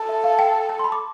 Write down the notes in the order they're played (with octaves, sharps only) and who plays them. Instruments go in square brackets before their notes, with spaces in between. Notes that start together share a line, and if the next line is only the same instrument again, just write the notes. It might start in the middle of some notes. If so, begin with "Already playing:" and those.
Already playing: [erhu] A4
[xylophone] E5
F5
G5
A5
C6
B5
D6